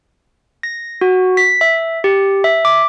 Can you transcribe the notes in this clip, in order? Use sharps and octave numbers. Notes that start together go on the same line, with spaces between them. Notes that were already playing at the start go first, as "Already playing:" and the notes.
A#6
F#4
B6
E5
G4
E5
D6